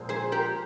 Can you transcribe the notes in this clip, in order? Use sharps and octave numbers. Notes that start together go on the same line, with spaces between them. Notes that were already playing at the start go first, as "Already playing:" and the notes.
Already playing: A#2 F3 G#3 C4
G#4 C5
G4 A#4